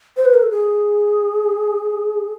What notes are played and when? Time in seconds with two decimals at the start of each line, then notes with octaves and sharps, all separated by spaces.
0.17 C5
0.25 B4
0.34 A#4
0.43 A4
0.51 G#4